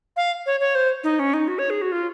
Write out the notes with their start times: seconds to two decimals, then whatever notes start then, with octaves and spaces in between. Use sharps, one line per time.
0.17 F5
0.46 C#5
0.60 C#5
0.75 C5
1.04 D#4
1.19 C#4
1.34 D#4
1.48 F#4
1.59 C#5
1.70 G#4
1.82 F#4
1.92 F4